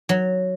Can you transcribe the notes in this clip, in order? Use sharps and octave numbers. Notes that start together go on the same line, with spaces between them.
F#3